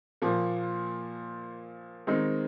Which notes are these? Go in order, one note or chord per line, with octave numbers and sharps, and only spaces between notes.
A#2 F3 A#3
D#3 G#3 C4 D#4